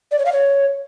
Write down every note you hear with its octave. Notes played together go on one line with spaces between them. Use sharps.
D5
C#5
F5
C#5